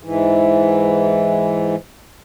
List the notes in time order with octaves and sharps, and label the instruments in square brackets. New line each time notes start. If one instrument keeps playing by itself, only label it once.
[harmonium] G#2 E3